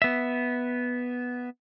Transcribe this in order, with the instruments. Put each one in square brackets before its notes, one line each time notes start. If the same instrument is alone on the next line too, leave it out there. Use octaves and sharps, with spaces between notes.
[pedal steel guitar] B3 E5